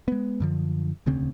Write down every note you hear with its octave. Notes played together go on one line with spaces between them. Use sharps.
G#3 B3
F#2 D3 F3
E1 D2 C#3 C4